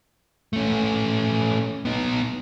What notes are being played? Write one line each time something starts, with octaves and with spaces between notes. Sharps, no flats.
A3 C#4
B3 D#4